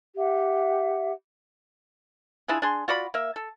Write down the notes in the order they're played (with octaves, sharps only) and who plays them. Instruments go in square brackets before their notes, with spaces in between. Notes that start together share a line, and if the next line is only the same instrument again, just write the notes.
[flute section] G4 E5 F#5
[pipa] D4 E4 F4 G#4
D4 G#4 C6
F4 F#4 D5 B5
A#3 E5
A4